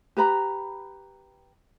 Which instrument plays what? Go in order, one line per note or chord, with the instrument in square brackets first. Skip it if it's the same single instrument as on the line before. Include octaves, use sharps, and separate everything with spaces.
[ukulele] G4 B4 A#5 B5